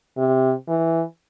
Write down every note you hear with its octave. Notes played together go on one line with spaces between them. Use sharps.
C3
E3